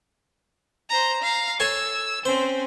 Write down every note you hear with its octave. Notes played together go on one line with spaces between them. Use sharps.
C5 A#5
F5 A#5
A4 C#5 G#5 E6
C4 C#4 C5